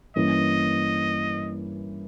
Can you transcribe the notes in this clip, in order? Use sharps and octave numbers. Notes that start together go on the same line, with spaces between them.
G2 E3 A#3 C#4 D#5